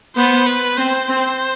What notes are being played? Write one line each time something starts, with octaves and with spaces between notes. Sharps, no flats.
B3 C5
B4
C4 C5
C4